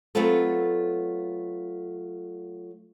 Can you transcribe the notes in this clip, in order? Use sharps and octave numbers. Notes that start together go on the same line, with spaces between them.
F#3 A3 B3 C4 F4 A4